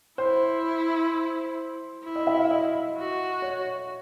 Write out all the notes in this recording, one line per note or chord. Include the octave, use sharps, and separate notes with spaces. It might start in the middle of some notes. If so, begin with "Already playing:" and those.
E4 C5
E4
D#5
E5
F5
D#5
F#4
C#5